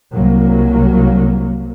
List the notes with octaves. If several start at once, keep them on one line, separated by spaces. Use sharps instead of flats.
C2 F#3 A#3